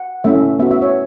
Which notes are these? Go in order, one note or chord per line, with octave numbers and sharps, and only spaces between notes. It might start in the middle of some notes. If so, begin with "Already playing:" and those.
Already playing: F#5
A3 C#4 E4 E5
B3 F#4 E5
E5
C#5